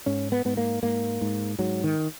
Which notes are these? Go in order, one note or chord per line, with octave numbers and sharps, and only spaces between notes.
G#2 C#4
B3
G#2 B3
A#3
G#2 A#3
G#2
G#2 F#3
D#3